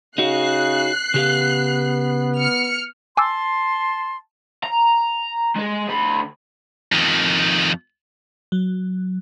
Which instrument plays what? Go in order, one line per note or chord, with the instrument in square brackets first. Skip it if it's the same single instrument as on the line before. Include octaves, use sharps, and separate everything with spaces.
[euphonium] C#3 [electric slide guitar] D#4 F#4 [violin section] F#6 C7
[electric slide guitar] C#3 G4 F5 [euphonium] B3
[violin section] F6 C#7
[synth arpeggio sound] G#5 D6 E6 [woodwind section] A5 C6
[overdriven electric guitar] A#5
G#3 G#4
D2 B5
[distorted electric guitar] F2 D#3
[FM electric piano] F#3